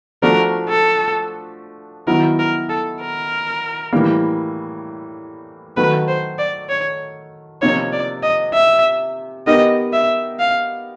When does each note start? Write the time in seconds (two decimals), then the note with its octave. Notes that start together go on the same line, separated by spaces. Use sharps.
0.22 F3 A3 D4 F#4 A#4
0.69 A4
2.07 D#3 F#3 B3 E4 A#4
2.39 A#4
2.69 A4
3.01 A#4
3.93 A2 E3 G3 A#3
5.77 D#3 F#3 A3 B4
6.08 C5
6.39 D5
6.69 C#5
7.61 C3 F3 A#3 D#4 C#5
7.92 D5
8.23 D#5
8.54 E5
9.47 B3 D#4 G4 A#4 D#5
9.93 E5
10.39 F5